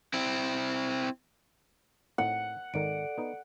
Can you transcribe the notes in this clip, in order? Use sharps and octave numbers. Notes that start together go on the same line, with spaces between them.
C4 E4
A2 C4 D#4 F#5
G#1 D#3 A4 A#4 D5 D7
B3 D#4